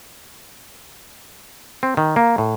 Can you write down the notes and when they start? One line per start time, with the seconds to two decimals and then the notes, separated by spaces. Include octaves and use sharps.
1.83 C4
1.97 D#3
2.16 A#3
2.38 A2